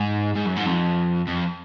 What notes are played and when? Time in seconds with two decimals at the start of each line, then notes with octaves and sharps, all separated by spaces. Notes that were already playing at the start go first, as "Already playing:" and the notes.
Already playing: G#2
0.36 G#2
0.46 F#2
0.57 G#2
0.66 F2
1.27 F2